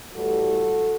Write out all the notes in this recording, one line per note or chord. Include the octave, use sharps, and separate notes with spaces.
A2 E3 G3 F#4 A4